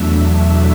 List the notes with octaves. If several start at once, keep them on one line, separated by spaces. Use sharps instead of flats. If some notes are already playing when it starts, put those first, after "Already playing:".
Already playing: E2 B2 F#3 A3 D4 E5